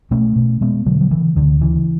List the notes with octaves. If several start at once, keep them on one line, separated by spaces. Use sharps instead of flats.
B2 A3 C#4
B2
B2 G#3 B3
B2 D3 F#3
F#3
C#3 E3
D2 D3
C#3 E3